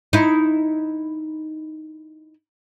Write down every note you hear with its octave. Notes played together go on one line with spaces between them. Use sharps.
D#4 E4